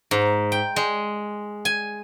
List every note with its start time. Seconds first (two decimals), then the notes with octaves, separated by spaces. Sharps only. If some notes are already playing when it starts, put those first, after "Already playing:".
0.11 G#2
0.52 G5
0.76 G#3
1.65 G#5